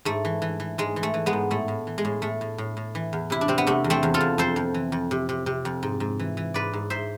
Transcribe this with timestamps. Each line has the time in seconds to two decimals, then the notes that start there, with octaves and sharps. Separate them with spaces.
0.05 G#2 A3
0.25 E3
0.42 E3
0.60 E3
0.78 G#2 G#3
0.96 E3
1.03 A3
1.14 E3
1.26 G#3 B3
1.33 G#2
1.51 A2 A3
1.68 A2
1.87 E3
1.98 G#3
2.05 A2
2.22 A2 A3
2.41 A2
2.58 A2
2.77 A2
2.95 E3
3.13 E2
3.30 C3 E4
3.41 D4
3.48 C3 C4
3.58 B3
3.67 C3 A3
3.84 E2
3.90 A3 C4
4.03 E2
4.14 F4 A4
4.20 E2
4.38 F2 A4 C5
4.56 F2
4.74 E3
4.92 F2
5.11 C3
5.29 C3
5.46 C3
5.65 F2
5.83 G#2
6.00 G#2
6.19 E3
6.37 E3
6.54 G#2 B4 D5
6.73 G#2
6.90 G#2 C5 E5